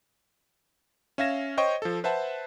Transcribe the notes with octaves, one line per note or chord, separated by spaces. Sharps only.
C#4 E5 F5 G#6 A#6 E7
C5 C#5 D#5 G5 C#6
F3 A4
B4 C5 E5 F#5 A5